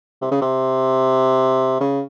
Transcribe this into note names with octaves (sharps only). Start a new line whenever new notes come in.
C3
C#3
C3
C#3